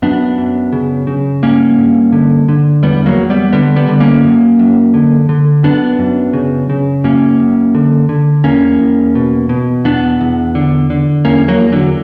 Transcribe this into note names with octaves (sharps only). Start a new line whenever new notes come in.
F#2 B3 D4
F#2
C#3
C#3
G2 A#3 C#4
G2
D3
D3
E2 G3 B3
F#3 A#3
E2
G3 B3
D3 G3 B3
G3 B3
D3
A#3 C#4
F#2
F#2
D3
D3
F#2 B3 D4
F#2
C#3
C#3
F#2 A#3 C#4
F#2
D3
D3
E2 A#3 C#4
E2
B2
B2
E2 B3 D4
E2
D3
D3
E2 A#3 C#4
F#3 A#3
E2
D3 F#3